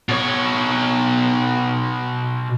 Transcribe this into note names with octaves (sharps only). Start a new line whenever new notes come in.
B2 C#5